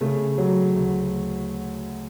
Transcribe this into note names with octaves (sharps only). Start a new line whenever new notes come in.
C#3 A3
F#3
D2